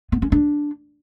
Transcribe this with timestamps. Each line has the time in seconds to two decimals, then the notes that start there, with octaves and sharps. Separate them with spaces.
0.12 B3
0.22 C#4
0.32 D4